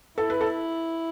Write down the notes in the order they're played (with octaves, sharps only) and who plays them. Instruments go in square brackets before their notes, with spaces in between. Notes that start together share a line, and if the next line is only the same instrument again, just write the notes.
[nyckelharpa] E4 [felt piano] A4
[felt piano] B4
A4